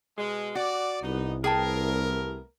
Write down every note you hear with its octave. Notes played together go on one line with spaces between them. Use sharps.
B2 G#3
F#4 D5
C2 B3 D4 D#4
A3 B3 G#4 A#4 G5 A5